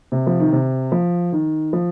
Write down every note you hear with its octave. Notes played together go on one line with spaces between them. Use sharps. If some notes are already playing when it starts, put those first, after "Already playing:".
C3
F3
D#3
C3
F3
D#3
F3